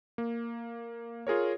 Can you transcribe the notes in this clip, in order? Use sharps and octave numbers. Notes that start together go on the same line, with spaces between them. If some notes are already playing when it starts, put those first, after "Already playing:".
A#3
F4 G#4 A#4 C#5